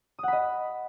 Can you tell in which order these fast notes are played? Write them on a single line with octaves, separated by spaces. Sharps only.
D#6 F#5 B5 D#5